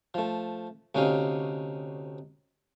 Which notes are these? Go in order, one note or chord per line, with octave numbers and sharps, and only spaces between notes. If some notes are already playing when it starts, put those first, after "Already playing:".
F3 A3
D2 C3 C#4 D#4 F5